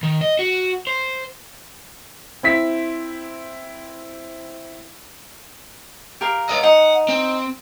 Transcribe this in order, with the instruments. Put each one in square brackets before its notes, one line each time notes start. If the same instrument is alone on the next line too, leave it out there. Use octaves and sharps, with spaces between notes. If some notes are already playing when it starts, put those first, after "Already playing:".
[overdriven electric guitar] D#3
D#5
F#4
C5
[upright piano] C4 E4 B6
[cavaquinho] G4 A#4 F5
[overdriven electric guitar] C#5 D#5
[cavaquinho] D#4 [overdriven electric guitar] F#5
[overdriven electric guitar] C4